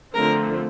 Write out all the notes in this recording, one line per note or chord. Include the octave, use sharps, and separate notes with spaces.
D3 F3 A3 C4 A#4